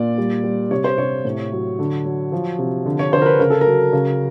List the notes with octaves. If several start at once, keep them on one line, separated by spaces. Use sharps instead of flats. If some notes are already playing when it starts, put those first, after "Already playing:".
Already playing: A#2 D5
G3
G3
C3 C#5
C5
C3 C#5
A2
F#3
D3
F#3
F3
C3
D3
C#5
D3 C5
A#4
B4
C#3 A#4
A4
A#4
F#3
C#3